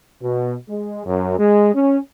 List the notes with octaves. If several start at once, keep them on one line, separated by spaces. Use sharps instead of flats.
B2
G#3
F#2
G#3
C#4